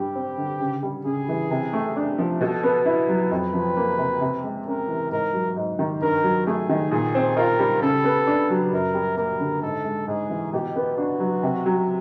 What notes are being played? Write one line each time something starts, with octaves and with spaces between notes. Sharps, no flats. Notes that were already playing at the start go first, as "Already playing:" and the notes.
Already playing: G2 G3 G4
C4
D3
C#3
G3
C#3 G#4
E3
C3
A3
D4
F3
B2 A4
B3
E4
F#3
F2 B4
F3
A#3
C3
C3
G#3
C#4 A#4
E3
G#2 A#4
F#3
G#2
D#3
G2 A#4
F#3
A3 G#4
D#3
A#2 G#4
C4
F4 A#4
G3
C#3 A4
B3
D4
F#3
F#2 A#4
G3
A#3 A#4
D3
G#2 A4
G#3
G#2 G#4
E3
B2 G4
B3
D4 F#4
F#3
C3
F#3